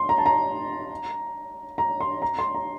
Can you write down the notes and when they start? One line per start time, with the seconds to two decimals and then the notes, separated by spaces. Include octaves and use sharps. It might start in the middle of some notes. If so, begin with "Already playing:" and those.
Already playing: C6
0.09 A#5
0.18 A5
0.26 A#5
1.78 A#5
2.01 C6
2.22 A#5
2.39 C6
2.55 A#5